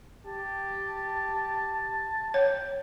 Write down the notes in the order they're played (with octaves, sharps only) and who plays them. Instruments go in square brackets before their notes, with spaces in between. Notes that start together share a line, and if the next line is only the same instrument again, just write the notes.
[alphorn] G4 [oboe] A5
[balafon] C#5 [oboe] G5